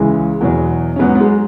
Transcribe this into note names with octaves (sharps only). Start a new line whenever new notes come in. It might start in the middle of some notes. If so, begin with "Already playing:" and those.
Already playing: C#2 C#3 E3 G#3
E2 B2 F#3
C#4
G#2 F#3 B3
B3
G#3